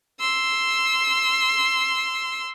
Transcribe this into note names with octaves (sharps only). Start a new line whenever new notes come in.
C6 E6